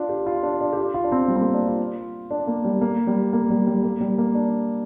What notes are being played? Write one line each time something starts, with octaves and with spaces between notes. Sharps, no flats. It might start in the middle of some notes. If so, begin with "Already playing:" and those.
Already playing: D4 F4
G4
F4
D4
D4
G4
F4
F4
D4
C4
G3
C4
A#3
D4
F4
D4
A#3
G3
A#3
G3
A#3
G3
G3
A#3
G3
A#3
D4